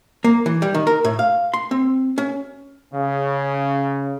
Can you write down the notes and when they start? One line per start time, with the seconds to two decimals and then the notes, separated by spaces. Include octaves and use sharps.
0.24 A#3
0.46 E3
0.62 G3
0.74 D#3
0.87 A#4
1.05 A2
1.19 F5
1.54 C6
1.71 C4
2.18 C#4
2.93 C#3